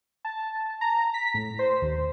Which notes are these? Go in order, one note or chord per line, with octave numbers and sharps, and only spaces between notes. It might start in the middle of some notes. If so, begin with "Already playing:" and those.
A5
A#5
B6
A2
C5
D#2